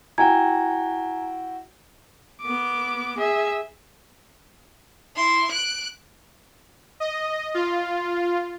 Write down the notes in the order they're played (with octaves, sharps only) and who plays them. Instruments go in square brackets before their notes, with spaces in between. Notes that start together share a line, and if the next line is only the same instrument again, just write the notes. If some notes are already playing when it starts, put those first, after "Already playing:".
[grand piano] E4 F#4 G5 [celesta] G#5 A#5 G#6
[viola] B3 D6
G#4 E5
[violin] E4 C6
F#6 D7
[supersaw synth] D#5
F4